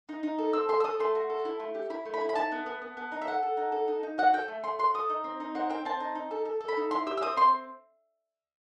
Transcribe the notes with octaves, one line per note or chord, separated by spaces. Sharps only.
D#4
D#4
A4
C4 E6
A4 C6
E6
A4 D#6
A3 C6
F#4
A4
E4
A3
G4
E4 B5
A3
B5
E4
B5
D#4 A5
B3
B3
B3
B3
D#4
E5
A4 F#5
A4
D#4
A4
D#4
D#4
F#4 F#5
A4 G5
A3
A3 C6
F#4 C6
A4 D#6
D#4
C4
D#4
C4 F#5
C4 G5
C4 A5
D#4
D#4
A4
A4
A4
B5
D#4
E4 C6
G4 E6
E6
C4 D#6
C4 C6